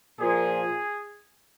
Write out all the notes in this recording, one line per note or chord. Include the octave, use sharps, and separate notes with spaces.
A#2 F3 G#4